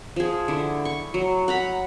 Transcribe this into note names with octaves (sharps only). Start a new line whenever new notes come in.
F3 G#4
D3 E4
C#6
F#3
F#5 A#5 B5